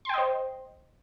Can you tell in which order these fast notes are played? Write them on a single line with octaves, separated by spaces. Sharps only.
C6 G5 D#5 C5